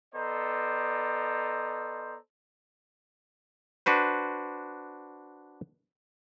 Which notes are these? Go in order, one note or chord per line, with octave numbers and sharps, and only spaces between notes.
B3 A4 C5 D5 D#5 A#5
D4 F#4 B4 C5